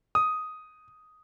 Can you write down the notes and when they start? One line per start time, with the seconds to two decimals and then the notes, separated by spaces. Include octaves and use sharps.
0.15 D#6